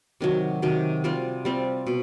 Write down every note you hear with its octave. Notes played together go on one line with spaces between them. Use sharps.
C3 D#3 F#3
C3 D#3 F#3
G3 C4 F4
G3 C4 F4
B2